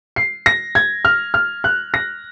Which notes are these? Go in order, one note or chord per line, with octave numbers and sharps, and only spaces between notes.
C7
A#6
G#6
F6
F6
F#6
A#6